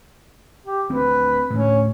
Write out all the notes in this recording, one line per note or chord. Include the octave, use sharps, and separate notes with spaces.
G4
D2 C4 B4
D2 A2 C#4